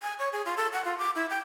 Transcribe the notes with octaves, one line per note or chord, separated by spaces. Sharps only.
G#5
C#5
G#4
F4
A4
F#5
F4
D6
E4
G5